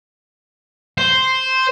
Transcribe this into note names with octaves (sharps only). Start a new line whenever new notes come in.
C5